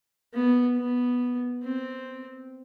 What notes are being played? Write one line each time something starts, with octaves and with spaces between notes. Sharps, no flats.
B3
B3
C4